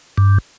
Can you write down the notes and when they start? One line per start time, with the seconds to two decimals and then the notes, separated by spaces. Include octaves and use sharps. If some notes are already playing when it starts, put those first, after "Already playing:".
0.18 G2